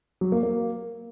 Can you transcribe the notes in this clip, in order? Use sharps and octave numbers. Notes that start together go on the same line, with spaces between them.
F#3
A#3
A#3